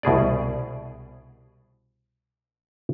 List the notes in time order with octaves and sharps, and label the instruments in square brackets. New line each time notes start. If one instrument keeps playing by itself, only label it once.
[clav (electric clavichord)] C2 B2 G#4 D5